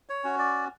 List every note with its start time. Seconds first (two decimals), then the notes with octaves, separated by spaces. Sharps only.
0.09 C#5
0.24 C#4 F#4
0.39 D5